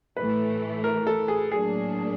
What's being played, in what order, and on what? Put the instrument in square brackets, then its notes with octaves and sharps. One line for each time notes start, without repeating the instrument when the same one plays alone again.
[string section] A2 E3 A3 [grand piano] B4
[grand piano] A#4
A4
G#4
[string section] A2 F#3 A#3 D4 [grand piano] G#4